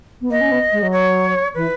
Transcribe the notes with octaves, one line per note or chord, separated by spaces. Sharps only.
B3
A#3 D#5
C#4
B3
G#3
F#3
C#5
E3 B4